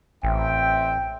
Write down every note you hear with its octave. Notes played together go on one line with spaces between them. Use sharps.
A1 C4 E5 G5